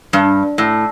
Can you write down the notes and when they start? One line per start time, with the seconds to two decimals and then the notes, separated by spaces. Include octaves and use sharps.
0.13 G2
0.58 A2